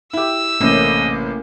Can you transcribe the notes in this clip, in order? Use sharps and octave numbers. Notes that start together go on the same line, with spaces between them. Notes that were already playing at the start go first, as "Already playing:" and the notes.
E4 G4 E6
A1 C3 A3 A#3 C#4 D#5